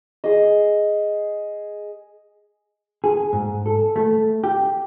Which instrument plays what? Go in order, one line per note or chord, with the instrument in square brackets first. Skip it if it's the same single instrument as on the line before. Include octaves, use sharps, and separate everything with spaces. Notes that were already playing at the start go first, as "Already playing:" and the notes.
[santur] G#4 D#5
[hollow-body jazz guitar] G#4
G#2
A4
A3
G4